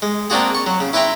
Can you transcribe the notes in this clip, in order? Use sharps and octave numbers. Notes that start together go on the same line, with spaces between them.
G#3
A#3 C4 D4 F4 F#4 G#4
C#6
F#3
C#3
E4 B4 E5 G5 A#5 C6